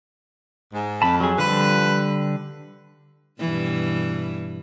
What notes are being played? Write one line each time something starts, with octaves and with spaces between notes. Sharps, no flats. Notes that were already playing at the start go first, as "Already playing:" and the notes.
G#2
F2 A5 B5
F#3 G#4
D3 F3 G3 B4
G2 B2 E3